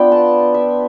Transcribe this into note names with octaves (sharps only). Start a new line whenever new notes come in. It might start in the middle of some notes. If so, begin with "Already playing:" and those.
Already playing: B3 D4 F4 G5 B5
A5
E5